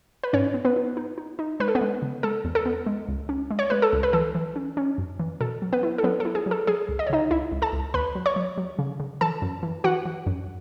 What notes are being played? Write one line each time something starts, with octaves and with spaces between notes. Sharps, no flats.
B4
G#2 C#4 C#5
B3
B3 B4
D#4
D#4
D#4
D#4
G#3 B4
A4
B3 B4
G#3
C#3
G#3 A4
E2
A4
B3
G#3
C#2
C#4
G#3
C#5
G#3 B4
A4
C#2
B4
E3 A4
E3
C#4
C#4
F#2
E3
B2 A4
F#3
B3 B4
E4
A4
F#3 B3 B4
A4
E4
G#4
F#3
A4
F#3 G#4
C#2
D#5
C#5
C#3 D#4 D#5
C#2 E4 E5
C#2
A4 A5
C#2
D#2 B4 B5
F#3
C#5 C#6
F#3
F#3
C#3
C#3
E3 A4 A5
F#2
E3
E3 F#4 F#5
E3
F#2